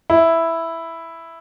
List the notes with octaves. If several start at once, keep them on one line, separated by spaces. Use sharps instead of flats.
E4